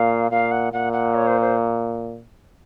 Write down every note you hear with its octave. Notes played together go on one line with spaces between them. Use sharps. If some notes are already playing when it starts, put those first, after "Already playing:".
Already playing: A#2 F5
A#2 F5
F#5
A#2 F#5
F#5
C#5
C5
C5